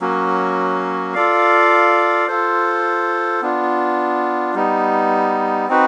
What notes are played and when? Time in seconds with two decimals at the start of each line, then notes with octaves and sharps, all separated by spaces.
0.01 F#3 A#3 C#4 F#4
1.14 F4 A4 D5 F5
2.28 F4 A4 C5
3.42 B3 D4 F4
4.54 G3 B3 D#4
5.68 C4 D#4 F#4 B4